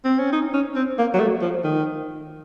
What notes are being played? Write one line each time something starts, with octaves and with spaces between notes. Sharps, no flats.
C4
C#4
D#4
C#4
C4
A#3
F#3
A3
F3
D#3